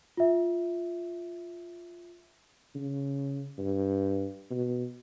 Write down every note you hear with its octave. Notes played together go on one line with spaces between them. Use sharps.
F4 E5
C#3
G2
B2